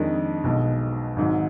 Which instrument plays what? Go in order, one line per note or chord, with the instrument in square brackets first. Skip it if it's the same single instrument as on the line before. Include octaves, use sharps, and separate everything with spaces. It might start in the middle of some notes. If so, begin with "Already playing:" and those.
Already playing: [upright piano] F2 D#3 G#3 D4
B1 B2 G#3
G#1 G#2 F#3